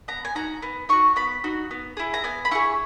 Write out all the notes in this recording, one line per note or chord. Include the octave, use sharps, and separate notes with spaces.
B3 A#5
G#5
D#4 F#4 A#5
B3
D#4 F#4 C#6
B3 B5
D#4 F#4
B3
E4 G#4
A#5
B3 G#5
B5
E4 G#4 C#6